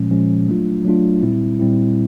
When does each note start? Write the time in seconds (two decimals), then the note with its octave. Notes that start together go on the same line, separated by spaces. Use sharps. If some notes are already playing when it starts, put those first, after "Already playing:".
Already playing: A#2 F3 G#3 C#4
0.11 A#2 F3 G#3 C#4
0.48 F#3 A3 D4 F4
0.85 F#3 A3 D4 F4
1.23 A#2 G3 C4 E4
1.60 A#2 G3 C4 E4